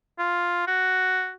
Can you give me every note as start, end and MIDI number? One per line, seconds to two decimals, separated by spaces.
0.19 0.64 65
0.68 1.32 66